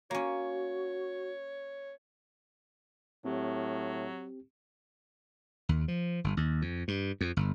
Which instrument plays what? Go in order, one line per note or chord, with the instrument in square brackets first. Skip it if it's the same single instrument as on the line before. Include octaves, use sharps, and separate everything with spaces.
[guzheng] A#3 C#4 [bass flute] F#4 [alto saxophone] C#5
[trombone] A2 [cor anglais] F#3 [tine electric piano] C4 G4
[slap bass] D#2
F3
G1
D#2
F2
G2
F2
G1